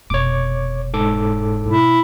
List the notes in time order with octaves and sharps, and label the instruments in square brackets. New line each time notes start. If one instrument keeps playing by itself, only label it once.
[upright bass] F1 B2 [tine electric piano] C#5 D6
[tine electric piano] G#2 A4 D6
[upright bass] B2 [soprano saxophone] E4